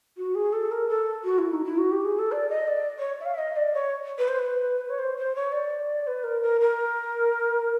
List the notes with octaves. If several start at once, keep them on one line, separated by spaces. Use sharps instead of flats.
F#4
G#4
A4
A#4
A4
F#4
E4
D#4
E4
F#4
G4
G#4
A4
D5
D#5
D5
C#5
E5
F5
E5
D#5
D5
C#5
B4
C5
B4
C#5
C5
C5
C#5
D5
B4
A#4
A#4
A#4